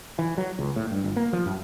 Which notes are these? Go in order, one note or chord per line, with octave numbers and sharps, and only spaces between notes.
E3
F#3
C#2
A2
G2
G1
A#3
F3
F#2